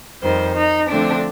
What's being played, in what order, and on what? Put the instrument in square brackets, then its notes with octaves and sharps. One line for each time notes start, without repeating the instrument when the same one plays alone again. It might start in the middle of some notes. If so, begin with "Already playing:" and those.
[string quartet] F2 D#3 G3 C5
D#4
D3 F3 A3 C4 D4